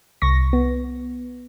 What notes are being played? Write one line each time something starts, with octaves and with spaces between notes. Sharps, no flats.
C2 C#6 A#6
B3